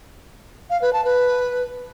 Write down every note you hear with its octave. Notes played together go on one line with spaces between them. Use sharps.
F5
B4
A5
B4